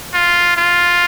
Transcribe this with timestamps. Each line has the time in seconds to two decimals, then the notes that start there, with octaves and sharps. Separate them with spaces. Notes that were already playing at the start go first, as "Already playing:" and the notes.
0.14 F4
0.57 F4